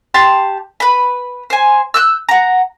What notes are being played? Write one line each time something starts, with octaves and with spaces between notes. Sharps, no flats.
G4 A5 C6
B4 B5
C5 G#5
E6 F#6 G6
F#5 A#5